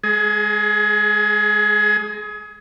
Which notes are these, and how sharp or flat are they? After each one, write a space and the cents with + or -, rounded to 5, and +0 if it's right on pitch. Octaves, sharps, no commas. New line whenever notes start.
G#3 +0 G#4 +30